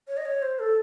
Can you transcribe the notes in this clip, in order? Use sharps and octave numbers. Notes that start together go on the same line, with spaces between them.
C#5
D#5
C#5
C5
A4